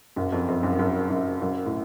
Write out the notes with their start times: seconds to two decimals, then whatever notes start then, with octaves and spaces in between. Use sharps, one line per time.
0.16 F#1 F#2
0.32 F2
0.48 F2
0.63 F#1 F#2
0.79 F#1 F#2
1.10 F#1 F#2
1.41 F#1 F#2
1.66 A2